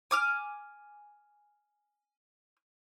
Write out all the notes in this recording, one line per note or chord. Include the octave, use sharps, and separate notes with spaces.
G#5 D6 F6